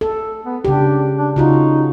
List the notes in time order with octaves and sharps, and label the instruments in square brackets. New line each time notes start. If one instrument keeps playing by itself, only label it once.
[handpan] A4
[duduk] B3
[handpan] C#3 G4 [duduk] D4
[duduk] D4
[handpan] C#3 F4 F#4 [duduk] D#4